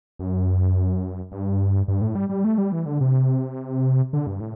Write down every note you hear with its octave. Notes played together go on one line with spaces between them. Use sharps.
F#2
G2
G2
A2
G3
G3
A3
G3
E3
D3
C3
D3
G2
A2